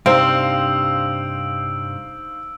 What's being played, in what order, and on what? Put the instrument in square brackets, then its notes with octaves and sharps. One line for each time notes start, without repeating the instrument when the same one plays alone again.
[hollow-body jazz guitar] G2 C3 [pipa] C4 [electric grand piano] D#4 C5 F5 [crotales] E6 D7